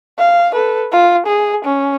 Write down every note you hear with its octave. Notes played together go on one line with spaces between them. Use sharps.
F5
A4 B4
F4
G#4
C#4